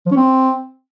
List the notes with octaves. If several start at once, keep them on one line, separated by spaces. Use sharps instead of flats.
F3
C#4
C4